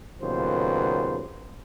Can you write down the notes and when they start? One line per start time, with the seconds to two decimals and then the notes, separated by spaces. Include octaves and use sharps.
0.21 D#2 A#2 C#3 F#3 B3 C5